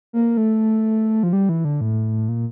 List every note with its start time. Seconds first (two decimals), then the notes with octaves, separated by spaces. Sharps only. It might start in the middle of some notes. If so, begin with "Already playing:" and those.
0.13 A#3
0.37 A3
1.23 F3
1.33 G3
1.49 E3
1.65 D3
1.81 A2
2.29 A#2